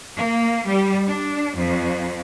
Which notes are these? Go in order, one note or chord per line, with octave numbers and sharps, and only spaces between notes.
A#3
G3
D4
F2